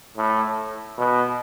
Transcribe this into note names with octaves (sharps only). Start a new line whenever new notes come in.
A2
B2